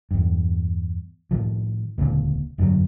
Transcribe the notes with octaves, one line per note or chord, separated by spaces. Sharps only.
E2 G2
A2 D#3 F3
D#1 C#2 A#2 D3
F1 G2 D3 F#3